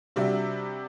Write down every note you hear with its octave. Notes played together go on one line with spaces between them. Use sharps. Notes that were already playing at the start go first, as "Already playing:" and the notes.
C3 G3 D4 F#4 E5